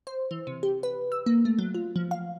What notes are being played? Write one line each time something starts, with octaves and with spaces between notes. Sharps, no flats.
C5
E3
C3
G4
B4
E6
A#3
A3
F#3
F4
F3
F5